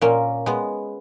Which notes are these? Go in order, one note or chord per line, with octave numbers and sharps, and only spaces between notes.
A#2 A#3 C#4
G#3 B3